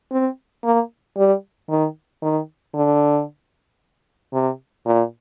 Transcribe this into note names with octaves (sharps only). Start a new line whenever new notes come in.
C4
A#3
G3
D#3
D#3
D3
C3
A#2